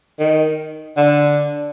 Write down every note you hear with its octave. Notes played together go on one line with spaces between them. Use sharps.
D#3
D3